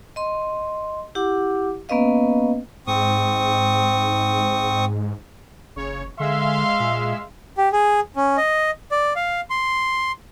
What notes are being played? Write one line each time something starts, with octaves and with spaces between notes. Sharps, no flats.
D#5 C6
E4 G4 F#5 D6
A#3 B3 C#4 B4 D#5 F5
G#2 C4 C#6 D#6
F#1 C#3 C#5
D3 G#3 E5 F5 C6 E6
A#2
G4
G#4
C#4
D#5
D5
F5
C6